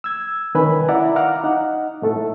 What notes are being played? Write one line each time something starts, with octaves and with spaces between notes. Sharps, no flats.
E6 G#6
C2 D#3 C#4 B4 G#5 B5
E4 D5 E5 F#5 A#5
F5 F#5 A#5 D6 F6
D#4 F#5
A2 A3 A4